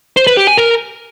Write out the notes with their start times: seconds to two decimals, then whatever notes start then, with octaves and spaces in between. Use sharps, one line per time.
0.17 C5
0.27 B4
0.37 G4
0.47 G#5
0.57 A#4